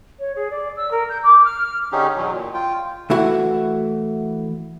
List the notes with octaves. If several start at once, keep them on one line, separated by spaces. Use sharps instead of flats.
C#5
G#4
D5
E6
A#4
G6
D6
F6
D3 C#4 D#4 G4 G#4
E2 B2 F#3
A#2
F4 G5
E3 A3 E4 F#4